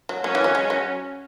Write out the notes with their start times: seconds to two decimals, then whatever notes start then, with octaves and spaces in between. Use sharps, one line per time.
0.09 F#3
0.24 F#3 C#4
0.35 E3
0.44 F#3
0.55 G#3
0.70 F#3